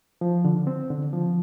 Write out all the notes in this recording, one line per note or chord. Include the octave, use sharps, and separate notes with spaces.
F3
D3
C4
D3
F3